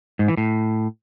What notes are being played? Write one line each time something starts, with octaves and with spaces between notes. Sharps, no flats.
G#2
E3
A2